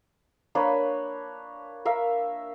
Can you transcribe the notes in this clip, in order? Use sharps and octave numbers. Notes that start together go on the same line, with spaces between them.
A#3 D4 B4 C#5
A#4 E5 F5